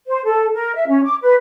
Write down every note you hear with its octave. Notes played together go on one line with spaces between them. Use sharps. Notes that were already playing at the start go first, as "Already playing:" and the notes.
C5
A4
A#4
E5
C#4
D6
B4